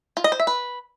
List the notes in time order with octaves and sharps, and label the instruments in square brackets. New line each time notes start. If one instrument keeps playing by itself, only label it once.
[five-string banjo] F4
D#5
C5
E5
B4